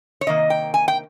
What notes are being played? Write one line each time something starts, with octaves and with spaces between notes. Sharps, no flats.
C#5
C3 D#3 A#3 D#5
G5
G#5
G5